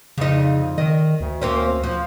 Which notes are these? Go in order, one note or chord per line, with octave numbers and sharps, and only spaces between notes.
F2 C#3 D#4
D#3 D#5
D2
A#3 C4 C#4
F3